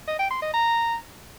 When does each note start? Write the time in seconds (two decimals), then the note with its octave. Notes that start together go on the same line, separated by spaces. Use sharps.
0.08 D#5
0.19 G5
0.31 C6
0.42 D#5
0.54 A#5